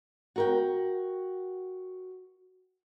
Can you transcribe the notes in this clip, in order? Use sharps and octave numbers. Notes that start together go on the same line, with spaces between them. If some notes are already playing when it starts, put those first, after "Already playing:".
F#4 A#4 G5